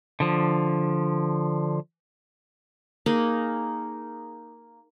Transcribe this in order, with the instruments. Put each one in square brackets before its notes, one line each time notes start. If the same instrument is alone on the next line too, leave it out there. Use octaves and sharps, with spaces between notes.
[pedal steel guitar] D3 F3
[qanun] A#3 D#4 G#4